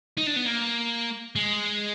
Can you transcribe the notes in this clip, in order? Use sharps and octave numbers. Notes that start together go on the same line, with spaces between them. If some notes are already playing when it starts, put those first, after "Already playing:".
D#4
D4
B3
A#3
G#3